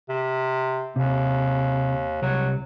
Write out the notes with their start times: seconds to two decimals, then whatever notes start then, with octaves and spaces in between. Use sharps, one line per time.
0.09 C3
0.96 D#2 C3
2.22 C2 F#3 C#5